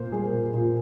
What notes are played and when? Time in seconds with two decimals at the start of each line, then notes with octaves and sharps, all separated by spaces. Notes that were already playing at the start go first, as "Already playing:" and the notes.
Already playing: A#2 A#3 C5
0.12 G3 G#4
0.33 A#2
0.54 A#2 F4